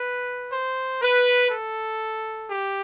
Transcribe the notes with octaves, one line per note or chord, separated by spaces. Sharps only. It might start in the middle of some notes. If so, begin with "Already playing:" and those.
Already playing: B4
C5
B4
A4
G4